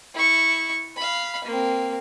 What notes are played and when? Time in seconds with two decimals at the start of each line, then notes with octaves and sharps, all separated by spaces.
0.15 E4 C#6
0.96 F5 B5
1.44 A#3 C4